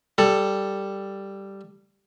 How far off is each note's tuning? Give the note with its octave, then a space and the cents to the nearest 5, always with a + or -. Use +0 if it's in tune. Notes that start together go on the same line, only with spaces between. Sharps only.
G3 +0 A4 +5